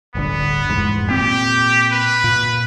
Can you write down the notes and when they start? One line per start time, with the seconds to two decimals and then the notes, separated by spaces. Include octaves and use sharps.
0.15 D1 G1 D3 B3
0.69 F1 E2 G#2
1.10 A#2 C4 G4
1.92 B4
2.24 A#2